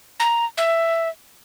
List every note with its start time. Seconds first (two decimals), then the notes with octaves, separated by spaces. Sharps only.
0.20 A#5
0.58 E5